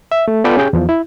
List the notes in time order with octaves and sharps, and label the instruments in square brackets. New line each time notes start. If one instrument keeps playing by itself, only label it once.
[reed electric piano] E5
A3
B3 F4 A4 B4 D5 G5
C#4 G4 G#4 G5
E2 F3
E4